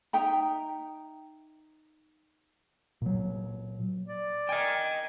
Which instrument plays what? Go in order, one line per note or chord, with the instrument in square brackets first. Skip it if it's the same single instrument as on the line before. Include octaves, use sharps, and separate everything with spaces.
[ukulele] D#4 E5 G5 A#5
[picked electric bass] A#2 F#3
[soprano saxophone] D5
[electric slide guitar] D#5 G5 [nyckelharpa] G#5